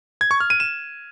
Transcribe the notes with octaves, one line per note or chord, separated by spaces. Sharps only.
G#6
C#6
F6
D#7
E7